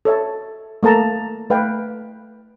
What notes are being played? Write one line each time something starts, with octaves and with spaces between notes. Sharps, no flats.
A4 C#5 E5 A5
A3 A#3 A4 A5 A#5
A3 B4 F5 G5